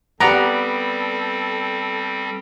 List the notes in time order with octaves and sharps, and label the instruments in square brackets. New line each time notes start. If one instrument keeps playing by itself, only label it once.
[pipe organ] G3 C4 [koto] B3 D5 [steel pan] G4 F#5 A#5 [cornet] A4